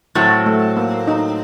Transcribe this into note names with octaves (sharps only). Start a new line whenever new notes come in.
A2 F#3 C4
A3
A#3
D#4